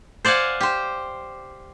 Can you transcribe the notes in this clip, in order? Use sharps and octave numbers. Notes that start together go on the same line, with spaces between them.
C5 D5 F5 F#5 G#5
G4 C5